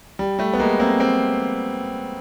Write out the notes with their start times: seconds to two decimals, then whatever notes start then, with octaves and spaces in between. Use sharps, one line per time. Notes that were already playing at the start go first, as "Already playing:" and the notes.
0.19 G3
0.39 G3 A3
0.53 B3
0.59 G#3 A#3
0.80 A#3 C4
1.00 A#3 C4